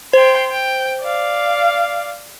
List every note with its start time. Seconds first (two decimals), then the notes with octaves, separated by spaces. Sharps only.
0.13 C5 G5 C6
0.51 G5
1.02 D5 F5